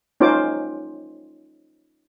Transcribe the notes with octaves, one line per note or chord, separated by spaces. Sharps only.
C#4 D#4 F4 C5 D6